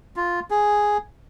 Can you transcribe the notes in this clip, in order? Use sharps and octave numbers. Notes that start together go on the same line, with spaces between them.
F4
G#4